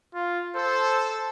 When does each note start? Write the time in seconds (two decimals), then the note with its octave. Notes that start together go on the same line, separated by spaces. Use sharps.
0.14 F4
0.56 A4 C5